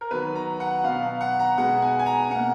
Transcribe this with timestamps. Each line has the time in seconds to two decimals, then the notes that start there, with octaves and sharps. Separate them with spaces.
0.01 A#4
0.11 D#3 F#3 B3 B4
0.35 A#5
0.60 F#5
0.84 B2 F#3 B3 F5
1.03 F5
1.21 F#5
1.39 A#5
1.58 B2 G#3 B3 F#5
1.82 G#5
1.99 G#5
2.06 A#5
2.31 B2 A#3 F#5